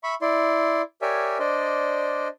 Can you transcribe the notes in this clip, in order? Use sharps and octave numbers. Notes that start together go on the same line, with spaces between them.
E5 B5 C#6
E4 D5 C6
G4 A#4 C#5 D5 E5 G#5
D4 C5 D5 D#5